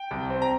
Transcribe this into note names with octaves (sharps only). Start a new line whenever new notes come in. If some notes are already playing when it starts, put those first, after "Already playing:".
Already playing: G5
C2
C4
A#5